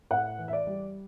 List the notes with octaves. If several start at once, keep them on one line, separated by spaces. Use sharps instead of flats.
A2 F#5
E3
E5
D5
G3